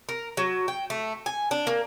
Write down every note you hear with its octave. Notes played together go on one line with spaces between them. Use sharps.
A#4
F#3
G5
A3
G#5
D4
A#3